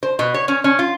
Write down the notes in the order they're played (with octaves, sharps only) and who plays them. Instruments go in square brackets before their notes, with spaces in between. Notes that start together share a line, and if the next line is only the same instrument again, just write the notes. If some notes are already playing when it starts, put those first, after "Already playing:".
[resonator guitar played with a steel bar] C5
B2
C#5
C#4
C#4
F4